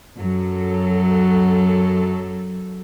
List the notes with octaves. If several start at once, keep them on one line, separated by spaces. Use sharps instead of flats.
F#2 F#3 A4